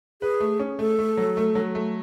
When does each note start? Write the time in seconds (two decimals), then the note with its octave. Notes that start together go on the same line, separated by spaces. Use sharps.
0.21 G#4 B4
0.40 A3
0.59 C#4
0.79 A3 A4
0.99 A3
1.17 F#3
1.37 A3
1.55 F#3
1.75 A3